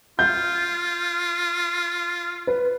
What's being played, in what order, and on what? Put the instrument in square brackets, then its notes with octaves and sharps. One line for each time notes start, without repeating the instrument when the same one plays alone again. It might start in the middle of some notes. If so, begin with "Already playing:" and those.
[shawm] F4 [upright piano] G6
[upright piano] B4